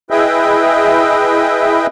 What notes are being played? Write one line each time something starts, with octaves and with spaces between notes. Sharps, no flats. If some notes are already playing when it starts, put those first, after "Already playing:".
E4 G#4 B4 D#5 E5 G5